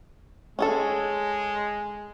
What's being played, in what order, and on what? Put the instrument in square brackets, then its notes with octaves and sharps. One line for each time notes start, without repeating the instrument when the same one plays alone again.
[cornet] G#3 [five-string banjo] C#4 G#4 A4